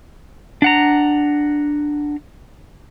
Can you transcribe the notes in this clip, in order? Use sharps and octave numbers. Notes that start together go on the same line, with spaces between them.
D4 F#5 A#5